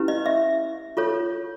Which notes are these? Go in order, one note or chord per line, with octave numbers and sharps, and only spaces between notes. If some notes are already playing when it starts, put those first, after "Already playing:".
Already playing: C#4 E4 G4 B4
D#5
E5
F4 A4 C#5